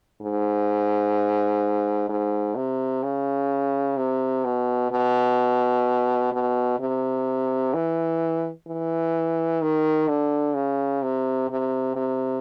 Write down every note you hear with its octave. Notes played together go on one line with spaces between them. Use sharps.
G#2
G#2
C3
C#3
C3
B2
B2
B2
C3
E3
E3
D#3
D3
C#3
C3
C3
C3